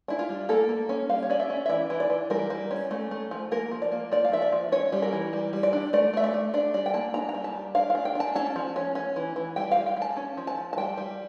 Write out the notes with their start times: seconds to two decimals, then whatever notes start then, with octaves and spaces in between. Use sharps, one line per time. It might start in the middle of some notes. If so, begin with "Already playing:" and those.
0.08 D4 E4
0.19 F4
0.29 G3
0.49 A#3 A4
0.69 A#3
0.89 C#4
1.09 G3 F5
1.22 C#5
1.30 C#4 D5
1.40 E5
1.50 C#4
1.66 E5
1.69 E3 D5
1.90 E3
2.00 D5
2.10 E3
2.30 G3 A#4
2.50 G3
2.71 C#4
2.91 A3
3.11 A3
3.31 F3
3.51 A#3 A#4
3.71 F3
3.82 D5
3.92 A#3
4.12 F3 D5
4.25 F5
4.32 F3 E5
4.42 D5
4.52 F3
4.72 C#4 C#5
4.92 G3
5.02 A#4
5.13 E3
5.33 G3
5.53 G3
5.63 D5
5.73 D4
5.93 A3 D5
6.13 A3 E5
6.24 D5
6.34 A3
6.54 D4 D5
6.74 G3 D5
6.86 G5
6.94 A#3 A5
7.14 D4 A#5
7.29 A#5
7.34 G3
7.44 A5
7.55 G3
7.75 D4 F5
7.90 F5
7.95 D4
8.05 G5
8.15 D4 A5
8.35 C#4 A5
8.56 F3
8.76 C#4
8.95 C#4
9.16 E3
9.36 E3
9.56 G3 G5
9.71 F5
9.77 G3
9.86 G5
9.97 G3
10.02 A5
10.17 C#4
10.37 F3
10.47 A5
10.57 F3
10.73 A5
10.78 G3 G5
10.98 G3